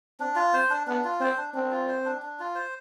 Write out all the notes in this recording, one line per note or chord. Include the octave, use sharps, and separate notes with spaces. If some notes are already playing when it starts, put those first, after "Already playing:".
C4 D4
F4
C4 C5
D4
B3 D4
F4
C4 C5
D4
C4 D4
F4
C5
D4
D4
F4
C5